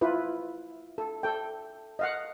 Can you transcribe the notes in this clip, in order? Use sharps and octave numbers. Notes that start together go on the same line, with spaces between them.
E4 F4 B4
A4
A4 G5
D#5 F5 F#5